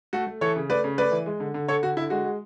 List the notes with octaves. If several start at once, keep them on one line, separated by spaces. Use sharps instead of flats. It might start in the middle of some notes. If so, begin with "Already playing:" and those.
A3 F#4 A4
A3
E3 A4 C#5
C#3
A3 B4 D5
C#3
A3 B4 D5
E3
G#3
D3
D3
D3 A4 C#5
D3 F#4
D3 E4
G#3 F#4
G#3